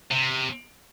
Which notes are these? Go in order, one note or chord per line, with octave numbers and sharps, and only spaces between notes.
C3